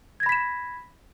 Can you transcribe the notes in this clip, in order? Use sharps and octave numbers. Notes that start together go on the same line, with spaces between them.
B5 G#6 A#6 B6 E7